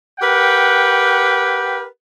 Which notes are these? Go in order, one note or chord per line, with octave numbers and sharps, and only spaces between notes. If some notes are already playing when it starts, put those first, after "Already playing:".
G4 A#4 B4 F#5 G5